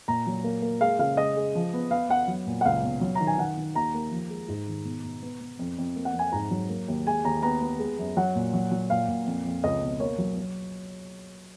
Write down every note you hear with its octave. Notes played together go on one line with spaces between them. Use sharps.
A#2 A#5
F#3
A#3
A#3
G#3 F5
C#3 F5
G#3 D#5
G#3
F3
B3
B3 F5
B3 F#5
F#3
A#2
F#5
C#2 F5
B2
F#3
A#5
D#3
G#5
D#3 F#5
D#3
D#2 A#5
A#3
F3
G#3
G#2
D#3
B2
B2
B3
B3
F2
F2
A#3
F#5
F2
G#5
G#2 A#5
F#3
A#3
D#2
G#3 G#5
D#2 A#5
B3 A#5
B3
G#3
F#2
F#3 F#5
A#2
F#3
F#3
A#2 F5
A#2
F2
F2
C#2 D#5
B2
A#3 C#5
F#3
F#3